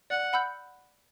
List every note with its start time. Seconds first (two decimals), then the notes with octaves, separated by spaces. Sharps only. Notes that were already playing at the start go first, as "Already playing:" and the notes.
0.10 D5 F#5
0.33 F#5 B5 E6 G6